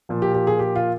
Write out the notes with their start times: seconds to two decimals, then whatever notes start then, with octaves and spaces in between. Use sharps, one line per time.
0.09 A#2 F3
0.22 G4
0.34 G4
0.47 G#4
0.59 G4
0.76 F4